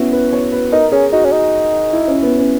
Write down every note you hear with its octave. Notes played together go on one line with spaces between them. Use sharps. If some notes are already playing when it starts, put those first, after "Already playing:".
Already playing: B3 C#4 E4 F#4
B4
C#5
B4
D#4 A#4
C#4 G#4
D#4 F#4
C#4
D#4
E4
C#4
B3
C#4